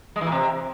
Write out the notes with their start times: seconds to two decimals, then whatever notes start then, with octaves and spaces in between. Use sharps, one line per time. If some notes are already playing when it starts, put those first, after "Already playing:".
0.16 G#3
0.21 E3
0.26 A#2
0.32 C3